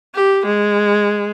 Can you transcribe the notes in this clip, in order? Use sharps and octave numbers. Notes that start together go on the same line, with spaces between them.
G4
G#3